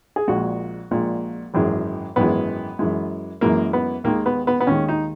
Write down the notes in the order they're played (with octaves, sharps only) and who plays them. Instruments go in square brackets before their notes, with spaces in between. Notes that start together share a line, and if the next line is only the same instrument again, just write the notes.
[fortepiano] G#4
A#1 A#2 G#3 F#4
A#1 A#2 G#3
G#1 F#2 E3 G#3
G#1 F#2 E3 G#3 B3
F#2 E3 G#3
F#2 E3 G#3 A#3
B3
D#2 D#3 G#3 A#3
B3
B3
B3
D#2 D#3 G#3 C#4
D#4